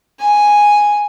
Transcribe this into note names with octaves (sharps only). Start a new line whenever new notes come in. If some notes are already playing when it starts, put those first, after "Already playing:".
G#5